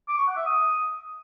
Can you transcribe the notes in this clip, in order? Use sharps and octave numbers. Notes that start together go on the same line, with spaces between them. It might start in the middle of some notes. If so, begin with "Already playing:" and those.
D6
C#6
F#5
E5
D#6